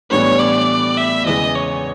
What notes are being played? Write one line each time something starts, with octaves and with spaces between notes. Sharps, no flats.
A2 E3 G3 B3 D4 C#5
D5
E5
E2 C#3 E3 G#3 D#5
C#5